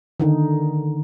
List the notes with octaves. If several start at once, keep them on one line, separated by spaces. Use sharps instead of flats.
D3 D#3 D#4